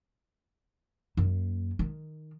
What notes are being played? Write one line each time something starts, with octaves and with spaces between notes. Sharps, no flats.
F#2 A#3
D#3